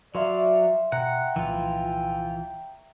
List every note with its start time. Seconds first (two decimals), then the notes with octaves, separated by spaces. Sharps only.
0.15 F#3 D5 E5 F5 C6
0.92 B2 F#5 G5 A#5
1.36 C2 A#2 E3 F3 F4